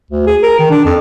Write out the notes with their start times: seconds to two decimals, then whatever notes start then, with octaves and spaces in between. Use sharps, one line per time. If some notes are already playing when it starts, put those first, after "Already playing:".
0.11 D2
0.27 G#4
0.43 A#4
0.59 D#3
0.70 D4
0.85 F2